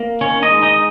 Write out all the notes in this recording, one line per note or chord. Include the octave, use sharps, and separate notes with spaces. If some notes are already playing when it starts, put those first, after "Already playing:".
Already playing: A#3
D#3 C#4 C#5
D#4 D#5
G#3
D#4 D#5